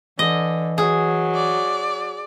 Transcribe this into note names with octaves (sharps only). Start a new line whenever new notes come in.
D3 E3 D#5
F#3 G#4
D5